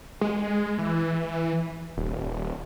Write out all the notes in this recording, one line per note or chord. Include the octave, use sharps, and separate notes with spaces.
G#3
E3
D#1